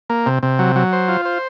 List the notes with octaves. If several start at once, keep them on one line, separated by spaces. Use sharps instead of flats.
A#3
C3
C3
F#3
F#3
C5
F4
C5